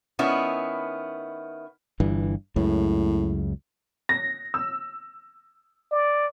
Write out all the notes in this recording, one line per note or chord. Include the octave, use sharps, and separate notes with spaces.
D#3 B3 C#4 E4
G1 G2 E3
C#2 F#2 A2 C#3
A#6
E6
D5